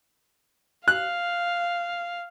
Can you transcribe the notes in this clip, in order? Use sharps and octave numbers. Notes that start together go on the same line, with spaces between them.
F5 F#6